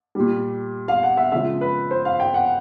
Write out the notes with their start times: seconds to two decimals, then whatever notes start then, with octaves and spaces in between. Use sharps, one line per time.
0.15 A#2 G3
0.88 F5
1.03 F#5
1.17 E5
1.32 C#3 F3 G#3 E5
1.61 B4
1.91 C5
2.05 F5
2.20 G5
2.34 F#5